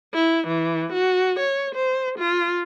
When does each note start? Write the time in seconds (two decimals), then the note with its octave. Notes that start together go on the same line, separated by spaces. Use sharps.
0.14 E4
0.48 E3
0.92 F#4
1.40 C#5
1.75 C5
2.18 F4